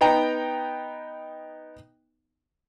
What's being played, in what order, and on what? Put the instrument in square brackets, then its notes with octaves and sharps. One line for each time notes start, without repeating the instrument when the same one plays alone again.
[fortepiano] B3 D#4 G5 A#5